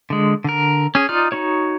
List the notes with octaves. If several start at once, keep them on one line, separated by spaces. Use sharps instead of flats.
D3 G#3
D3 A#4
C#4 G#4
D#4 F4 D5 F6
D#4 F#4 C#5